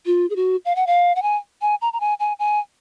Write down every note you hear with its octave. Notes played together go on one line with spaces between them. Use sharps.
F4
G#4
F#4
F5
F#5
F5
F#5
G#5
G#5
A#5
A#5
G#5
G#5
G#5